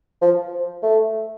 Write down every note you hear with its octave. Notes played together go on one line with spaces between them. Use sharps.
F3
A3